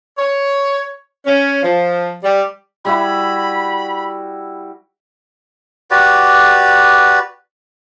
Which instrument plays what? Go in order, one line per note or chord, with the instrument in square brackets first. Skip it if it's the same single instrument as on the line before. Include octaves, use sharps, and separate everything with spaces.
[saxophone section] C#5
C#4
F3
G3
[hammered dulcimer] G3 E4 F#4 [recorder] B5
[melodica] F#4 G4 B4 D5